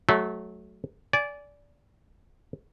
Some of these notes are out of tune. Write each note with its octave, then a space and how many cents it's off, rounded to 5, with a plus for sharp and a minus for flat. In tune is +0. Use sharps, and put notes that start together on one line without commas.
F#3 +0 A3 -25
D5 -20 G#5 +5